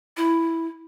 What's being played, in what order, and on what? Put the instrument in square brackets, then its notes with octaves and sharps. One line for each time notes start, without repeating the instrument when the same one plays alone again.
[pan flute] E4